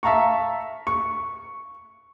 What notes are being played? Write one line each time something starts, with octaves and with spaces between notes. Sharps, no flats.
E5 F5 A5 A#5 C#6
C#6